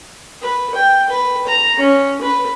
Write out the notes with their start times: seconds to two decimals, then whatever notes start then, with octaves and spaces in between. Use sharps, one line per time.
0.42 B4
0.75 G5
1.10 B4
1.47 A#5
1.79 C#4
2.22 B4